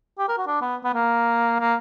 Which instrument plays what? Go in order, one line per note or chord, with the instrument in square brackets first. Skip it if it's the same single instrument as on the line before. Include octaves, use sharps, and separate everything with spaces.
[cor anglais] G4
A#4
F#4
D4
B3
B3
A#3
A#3